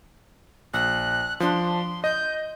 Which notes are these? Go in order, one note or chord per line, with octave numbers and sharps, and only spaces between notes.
A#1 F#6
F3 D4 C6
D#5 G6